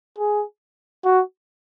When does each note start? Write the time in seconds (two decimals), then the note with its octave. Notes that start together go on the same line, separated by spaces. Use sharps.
0.18 G#4
1.05 F#4